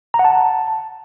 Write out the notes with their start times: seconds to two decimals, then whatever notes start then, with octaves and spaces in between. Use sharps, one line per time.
0.14 A#5
0.19 F#5
0.25 A5